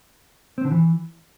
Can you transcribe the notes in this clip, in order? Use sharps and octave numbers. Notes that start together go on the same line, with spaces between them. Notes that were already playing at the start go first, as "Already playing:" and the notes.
C4
D3
E3